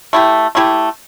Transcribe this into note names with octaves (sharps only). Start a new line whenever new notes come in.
A3 E4 G4
A3 E4 G4